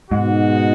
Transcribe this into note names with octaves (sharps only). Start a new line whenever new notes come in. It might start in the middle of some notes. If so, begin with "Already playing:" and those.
G#2 B2 G#3 D#4 F#4